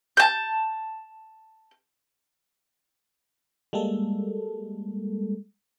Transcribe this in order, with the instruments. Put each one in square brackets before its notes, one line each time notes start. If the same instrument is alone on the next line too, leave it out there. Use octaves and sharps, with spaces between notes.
[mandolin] A5 G6
[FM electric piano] G3 G#3 A#3 A4